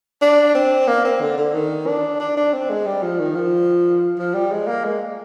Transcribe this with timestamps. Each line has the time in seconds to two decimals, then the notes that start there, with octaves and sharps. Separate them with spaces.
0.21 D4
0.55 C4
0.88 A#3
1.05 C4
1.21 D3
1.38 D3
1.54 D#3
1.87 D4
2.20 D4
2.37 D4
2.53 C4
2.70 G#3
2.86 G3
3.02 F3
3.19 D#3
3.35 F3
4.19 F3
4.34 G3
4.51 G#3
4.67 A#3
4.85 G#3